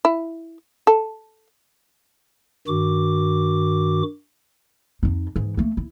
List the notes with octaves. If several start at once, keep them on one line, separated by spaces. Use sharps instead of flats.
E4
A4
G2 D#3 F#4 D6
F2 D#4
G#2 E3
A3 A#3
E4